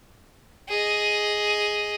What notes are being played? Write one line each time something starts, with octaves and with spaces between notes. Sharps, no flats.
G#4 D#5